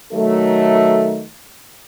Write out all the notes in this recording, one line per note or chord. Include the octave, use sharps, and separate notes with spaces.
D#3 F#3 A3